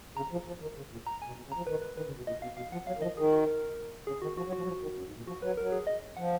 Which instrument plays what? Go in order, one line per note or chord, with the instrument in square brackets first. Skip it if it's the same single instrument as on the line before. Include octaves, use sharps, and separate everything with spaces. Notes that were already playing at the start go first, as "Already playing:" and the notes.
[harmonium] C#3 [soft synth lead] A#5
[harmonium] F3
F3
D#3
C#3
A#2
[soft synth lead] A#5
[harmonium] B2 [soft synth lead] G#5
[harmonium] B2
C#3
[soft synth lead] A#5
[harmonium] F3
[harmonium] D#3 [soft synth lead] B4
[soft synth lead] B4
[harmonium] D#3 [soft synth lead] B4
[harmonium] C#3
B2
[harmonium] A#2 [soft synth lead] D#5
[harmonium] B2 [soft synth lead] F5
[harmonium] B2 [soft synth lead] F5
[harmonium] F3 [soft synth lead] F#5
[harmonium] F#3 [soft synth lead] F5
[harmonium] D#3
[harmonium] F3 [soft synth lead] D#5
[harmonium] D#3 [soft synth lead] G#4
[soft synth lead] F#4
A#4
[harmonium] C#3 [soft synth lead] G#4
[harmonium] D#3 [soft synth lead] F#4
[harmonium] F3 [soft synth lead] F#4
[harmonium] F#3
[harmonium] F3 [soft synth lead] F#4
[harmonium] F#3
F3
D#3
F#2
G#2
A#2
[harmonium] F3 [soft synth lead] F#4
[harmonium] F#3 [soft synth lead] B4
[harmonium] F#3 [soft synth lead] A#4
[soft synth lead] G#4
D#5
[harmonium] F3 [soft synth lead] F#5